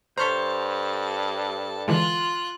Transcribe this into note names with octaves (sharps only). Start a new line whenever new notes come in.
G2 A4 C5 C#5 A#5 F6 B6
D3 E3 G#3 F4 F#6